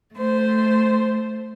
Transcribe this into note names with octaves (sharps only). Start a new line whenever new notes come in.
A3 C5